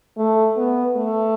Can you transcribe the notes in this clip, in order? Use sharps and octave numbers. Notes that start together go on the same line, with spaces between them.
A3
B3
A3